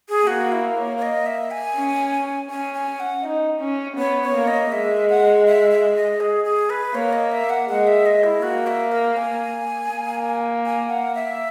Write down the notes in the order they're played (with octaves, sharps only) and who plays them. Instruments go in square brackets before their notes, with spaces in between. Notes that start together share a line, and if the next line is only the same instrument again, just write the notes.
[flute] G#4
[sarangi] A#3 [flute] F#4
[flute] E4
C#5
C#5
D#5
E5
G#5
[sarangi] C#4
[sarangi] C#4 [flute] G#5
[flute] G#5
F#5
[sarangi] D#4
C#4
[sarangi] B3 [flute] C#5
[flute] C#5
[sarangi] A#3
[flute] D#5
[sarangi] G#3 [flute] E5
[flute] F#5
E5
E5
D#5
G#4
G#4
B4
[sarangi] A#3 [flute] C#5
[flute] D#5
E5
F#5
[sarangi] G#3 [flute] F#5
[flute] E5
D#5
E4
[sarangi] A#3 [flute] F#4
[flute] E5
A#4
G#5
[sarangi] A#3
[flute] G#5
F#5
E5